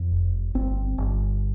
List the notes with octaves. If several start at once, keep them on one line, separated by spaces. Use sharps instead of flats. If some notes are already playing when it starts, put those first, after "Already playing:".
Already playing: F2
F1
G1 C4
G1